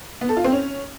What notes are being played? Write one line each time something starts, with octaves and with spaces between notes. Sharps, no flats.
B3
A4
F4
C4
C#4